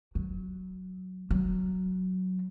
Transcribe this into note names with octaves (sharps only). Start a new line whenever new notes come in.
F#3
F#3